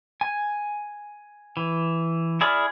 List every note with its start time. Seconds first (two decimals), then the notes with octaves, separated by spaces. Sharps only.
0.21 G#5
1.57 E3
2.41 E4 G#4 D5 B5 F6